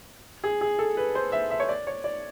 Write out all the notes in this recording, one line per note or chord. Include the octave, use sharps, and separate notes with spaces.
G#4
G#4
A4
B4
C5
E5
E5
C#5
D5
C#5
D5